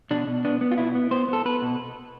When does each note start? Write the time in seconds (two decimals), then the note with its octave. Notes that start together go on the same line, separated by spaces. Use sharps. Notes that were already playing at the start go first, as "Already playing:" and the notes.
0.11 B2 D4
0.27 B2
0.45 B3 D4
0.61 B3
0.72 F4
0.78 B2 E4
0.95 B3
1.11 B3 C5
1.28 B3 A4
1.45 B3 B4
1.62 B2